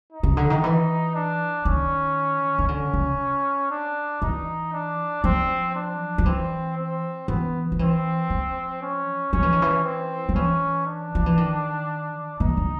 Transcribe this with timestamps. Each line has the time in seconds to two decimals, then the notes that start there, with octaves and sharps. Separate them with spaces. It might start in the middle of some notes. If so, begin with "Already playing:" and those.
0.12 D#4
0.23 C#3
0.37 D3
0.50 D#3
0.64 E3
1.14 D4
1.65 D#3 C#4
2.59 D#3
2.67 D3 C#4
2.94 C#3
3.70 D4
4.22 E3 D#4
4.73 D4
5.24 F3 C4
5.75 D4
6.18 F3
6.26 E3 C4
6.77 C4
7.28 E3 B3
7.72 F3
7.79 E3 C4
8.30 F3
8.82 C#4
9.33 F3 C#4
9.43 E3
9.53 D#3
9.62 E3
9.84 C4
10.29 F3
10.35 E3 C#4
10.86 D4
11.15 F3
11.26 E3
11.37 D#3
12.40 E3 D#4
12.57 D3